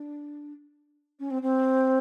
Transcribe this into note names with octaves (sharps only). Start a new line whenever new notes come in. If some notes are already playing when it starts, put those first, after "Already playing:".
Already playing: D4
C#4
C4
C4